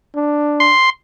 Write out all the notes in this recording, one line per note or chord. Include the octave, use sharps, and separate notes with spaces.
D4
C6